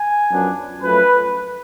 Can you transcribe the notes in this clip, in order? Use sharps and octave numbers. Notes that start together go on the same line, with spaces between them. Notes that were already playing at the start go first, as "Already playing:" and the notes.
Already playing: G#5
F#2 F3 B3 D4
F#2 F3 A3 C#4 B4